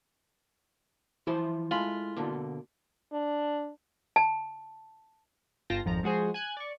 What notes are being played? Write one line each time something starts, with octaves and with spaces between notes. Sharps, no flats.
E3 F3 E4 C5
G#3 A3 F4 B5
B2 D3 A#3
D4
A5
G1 F4 G5 A5 A#6
G#1 F2 F3 A#5
F3 G#3 F#4 G#4 C5
G#5 F#6 G#6
D5 C#6